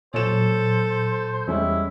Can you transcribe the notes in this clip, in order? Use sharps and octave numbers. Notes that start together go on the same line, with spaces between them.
A#2 F#3 A4 C5 C#5 E7
E2 G3 G#3 C#4 E4